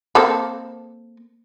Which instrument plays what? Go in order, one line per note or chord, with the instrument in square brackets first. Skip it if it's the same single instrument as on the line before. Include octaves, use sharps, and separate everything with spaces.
[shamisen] A#3 C4 A4